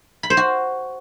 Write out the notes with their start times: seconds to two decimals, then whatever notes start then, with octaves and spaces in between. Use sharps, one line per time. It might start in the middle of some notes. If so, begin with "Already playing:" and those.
0.23 B5
0.30 C5
0.37 F#4